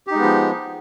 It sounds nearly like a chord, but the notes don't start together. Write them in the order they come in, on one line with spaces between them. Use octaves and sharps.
G4 D#4 G#3 B3 F3